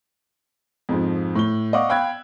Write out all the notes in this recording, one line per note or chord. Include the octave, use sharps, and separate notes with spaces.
F2 G#2 F3
A2 G7
D5 D#5 F5 F#5 C#6 D6
F5 G5 B5 E6 F#6 G#6